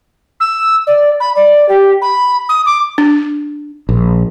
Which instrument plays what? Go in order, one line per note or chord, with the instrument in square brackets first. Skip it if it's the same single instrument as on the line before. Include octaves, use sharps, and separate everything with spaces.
[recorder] E6
D5
B5
D5
G4
B5
D#6
D6
[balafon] D4
[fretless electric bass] A#1